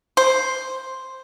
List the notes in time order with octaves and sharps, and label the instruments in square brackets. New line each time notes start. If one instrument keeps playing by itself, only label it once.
[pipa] C5